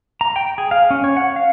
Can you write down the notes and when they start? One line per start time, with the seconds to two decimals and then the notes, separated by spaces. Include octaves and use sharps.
0.21 A#5
0.36 G5
0.58 G#4
0.71 F5
0.91 C#4
1.04 C#5
1.17 F#5
1.36 F5